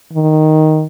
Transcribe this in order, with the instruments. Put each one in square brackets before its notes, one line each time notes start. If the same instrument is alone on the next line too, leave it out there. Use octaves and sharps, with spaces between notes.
[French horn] D#3